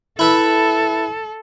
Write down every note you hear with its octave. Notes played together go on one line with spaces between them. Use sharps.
E4 A4 B4 E5